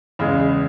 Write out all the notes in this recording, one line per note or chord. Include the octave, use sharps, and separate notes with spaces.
E2 C#3 G#3